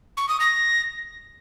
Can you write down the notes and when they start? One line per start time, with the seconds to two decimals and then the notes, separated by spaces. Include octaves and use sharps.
0.17 C#6
0.29 D#6
0.40 A#6